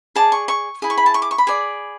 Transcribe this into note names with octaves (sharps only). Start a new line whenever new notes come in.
G#4 D5 A5
C#6
C#6
E4 G#4
C#6
B5
A5
C#6
D6
C#6
B5
G#4 D5